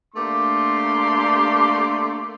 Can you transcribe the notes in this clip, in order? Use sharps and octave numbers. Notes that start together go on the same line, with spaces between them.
A3 A#3 D4 G4 C6